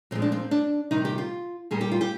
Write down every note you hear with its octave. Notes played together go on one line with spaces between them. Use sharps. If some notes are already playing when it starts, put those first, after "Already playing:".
A#2 F3 G#3 C4
D4
C4
D4
C3 D#3 G3 D#4
G4
F4
A#2 G3 A#3 G#4
G4
F4
G4